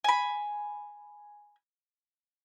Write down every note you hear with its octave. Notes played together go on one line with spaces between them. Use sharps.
G#5 B5